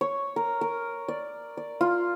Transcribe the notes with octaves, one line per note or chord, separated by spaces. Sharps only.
C#5
A#4
A#4
D5
D5
F4